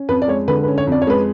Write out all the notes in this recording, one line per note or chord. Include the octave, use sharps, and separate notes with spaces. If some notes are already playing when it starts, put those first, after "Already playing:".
Already playing: C#4
F2 B4
D5
G#3 C#5
D3 B4
B4
C#4
C#5
F2 D5
C#5
G#3 B4